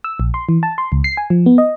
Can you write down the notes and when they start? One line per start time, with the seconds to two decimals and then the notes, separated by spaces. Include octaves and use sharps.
0.04 E6
0.20 A#1
0.34 C6
0.49 E3
0.63 A5
0.78 C6
0.92 C#2
1.04 C7
1.17 G#5
1.30 F3
1.46 B3
1.58 D#5